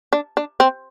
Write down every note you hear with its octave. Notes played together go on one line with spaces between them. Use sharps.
D4
D4
C4